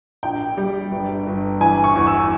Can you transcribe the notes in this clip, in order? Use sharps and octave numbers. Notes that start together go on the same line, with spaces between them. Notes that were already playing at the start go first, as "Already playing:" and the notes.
A#1 G5
G3
G1
G1
E3 G#5
C#6
E2
E6